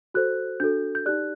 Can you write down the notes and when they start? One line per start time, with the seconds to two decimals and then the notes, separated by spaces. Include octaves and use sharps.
0.14 F#4 A4 C5 F#6
0.60 D4 F#4 A4 G6
0.95 G6
1.06 D#4 G4 D5 F#6